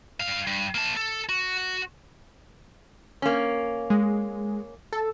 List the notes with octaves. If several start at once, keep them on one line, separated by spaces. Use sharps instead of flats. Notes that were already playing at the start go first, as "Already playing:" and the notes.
G2 F5
G2
A#3 A5
A4
F#4
A#3 C#4
G#3
A4